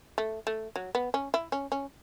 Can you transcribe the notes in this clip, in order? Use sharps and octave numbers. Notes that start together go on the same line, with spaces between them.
A3
A3
F#3
B3
C#4
E4
C#4
C#4